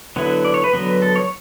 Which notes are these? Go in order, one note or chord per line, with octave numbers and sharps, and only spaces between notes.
D3 F#3 B3 E4
D5
C#5
B4
D3 F#3 B3
A4
C#5